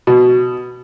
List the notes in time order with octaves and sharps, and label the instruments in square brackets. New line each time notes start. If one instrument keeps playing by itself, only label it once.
[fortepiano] B2